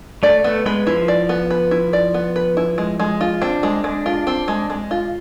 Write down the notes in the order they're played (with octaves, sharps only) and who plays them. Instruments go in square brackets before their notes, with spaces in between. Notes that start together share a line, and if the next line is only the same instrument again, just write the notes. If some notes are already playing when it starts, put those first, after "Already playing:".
[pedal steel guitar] A3 [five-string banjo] D5
[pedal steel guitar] A3 [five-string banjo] B3
[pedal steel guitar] G#3 [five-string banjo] B4
[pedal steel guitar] F3 [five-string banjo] E4
[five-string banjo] D5
B3
B4
E4
D5
B3
B4
E4
G#3
G#3
F4
[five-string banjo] C4 [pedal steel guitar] D4
[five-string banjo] G#3
G#3
F4
C4
G#3
G#3
F4